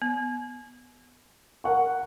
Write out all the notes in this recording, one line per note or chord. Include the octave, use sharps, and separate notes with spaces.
B3
A#4 F#5 C#6